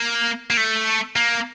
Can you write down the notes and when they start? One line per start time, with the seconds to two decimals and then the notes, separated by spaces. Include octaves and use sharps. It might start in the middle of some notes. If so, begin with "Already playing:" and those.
Already playing: A#3
0.50 A#3
0.57 A3
1.16 A#3